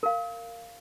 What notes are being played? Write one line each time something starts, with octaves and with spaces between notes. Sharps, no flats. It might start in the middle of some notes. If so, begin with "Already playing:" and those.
A#4 F5